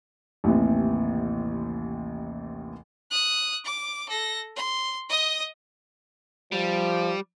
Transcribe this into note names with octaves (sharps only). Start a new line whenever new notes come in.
A1 D#2 C3 E3
D#6 F#6
D6
A4 A#6
C6
D#5 D#6
F3 G3